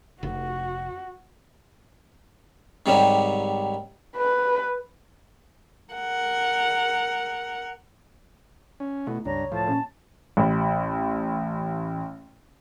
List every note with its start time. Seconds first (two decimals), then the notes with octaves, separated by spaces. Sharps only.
0.23 F1 F#4
2.86 G#2 C3 D#3 F#3 G3
4.16 B4
5.94 A#4 F#5
8.80 C#4
9.07 B2 A3 E4
9.25 C#2 G2 C#5 A#5
9.52 A2 F3 A5
9.67 A#2 C#4
10.37 A1 B5